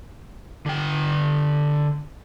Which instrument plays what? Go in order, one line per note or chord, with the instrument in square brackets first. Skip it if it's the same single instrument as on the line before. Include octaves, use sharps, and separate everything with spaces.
[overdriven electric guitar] D3 G5